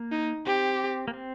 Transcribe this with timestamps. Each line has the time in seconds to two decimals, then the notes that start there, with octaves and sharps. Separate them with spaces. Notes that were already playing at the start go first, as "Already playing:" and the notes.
Already playing: A#3
0.12 D#4
0.46 C4 G4
1.08 A#3
1.14 C4